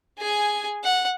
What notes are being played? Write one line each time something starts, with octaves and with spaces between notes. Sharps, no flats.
G#4 G#5
F#5